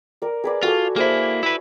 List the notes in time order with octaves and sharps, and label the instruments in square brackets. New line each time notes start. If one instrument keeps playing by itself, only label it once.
[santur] A#4 D5
G#4 B4 D5
[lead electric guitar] F4 [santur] F#4 A4 G#5
[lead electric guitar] A#3 E4 [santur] G#4 C5 E5
[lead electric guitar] E4 B4 [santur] B5